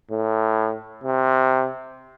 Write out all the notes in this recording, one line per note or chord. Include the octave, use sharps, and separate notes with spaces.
A2
C3